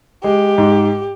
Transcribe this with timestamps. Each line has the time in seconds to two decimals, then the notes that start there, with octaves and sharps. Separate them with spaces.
0.24 G#3 G4
0.58 G#2